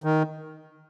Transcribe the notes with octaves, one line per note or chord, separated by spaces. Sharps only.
D#3